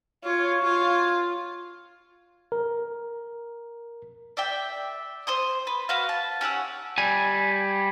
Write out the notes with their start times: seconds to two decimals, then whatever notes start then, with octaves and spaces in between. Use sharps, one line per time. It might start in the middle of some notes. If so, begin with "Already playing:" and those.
0.24 F4 C#5
0.63 F4
2.52 A#4
4.37 D5 E5 G5
5.27 C5 C6 D#6
5.67 B4
5.89 F#4 B4 F5
6.09 A5
6.41 C#4 G4 F#5 E6
6.98 G3 G#5